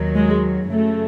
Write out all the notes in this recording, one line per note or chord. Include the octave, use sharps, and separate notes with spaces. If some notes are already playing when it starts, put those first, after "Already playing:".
Already playing: D#2 D#3 F#3
G#3
F#2 C#3 F#3 A3